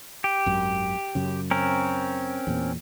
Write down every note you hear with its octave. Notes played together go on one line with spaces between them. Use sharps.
G4
G#1 F#2
F#2 C#3
C4 C#4 A#4
E2 A#2